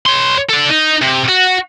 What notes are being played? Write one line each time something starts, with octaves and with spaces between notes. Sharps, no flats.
C#5 C6
A4 D5
D#4
C3
F#4